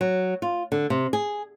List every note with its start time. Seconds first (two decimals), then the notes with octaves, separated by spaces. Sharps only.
0.01 F#3
0.42 F4
0.72 D3
0.90 C3
1.13 G#4